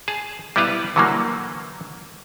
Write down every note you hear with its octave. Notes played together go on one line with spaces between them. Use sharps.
G#4 A5
G3 B3 E4 B4 F5
D3 E3 F#3 G3 A#3